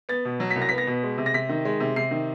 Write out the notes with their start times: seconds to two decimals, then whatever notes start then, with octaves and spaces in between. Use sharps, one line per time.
0.09 B3 A6
0.25 B2
0.40 F#3
0.51 B6
0.56 C2
0.62 A#6
0.69 B3 B6
0.78 A#6
0.87 B2
1.03 G#3
1.18 C3
1.26 A#6
1.34 C3 B6
1.49 D#3
1.65 G#3
1.80 C3
1.96 C3 C7
2.11 D#3